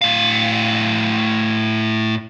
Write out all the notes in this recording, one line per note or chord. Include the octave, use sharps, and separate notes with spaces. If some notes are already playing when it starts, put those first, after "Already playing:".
A2 F5